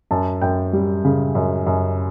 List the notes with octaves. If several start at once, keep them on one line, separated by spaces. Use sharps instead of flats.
F#2 A5
F#2 G5
G3
C#3
F#2
F#2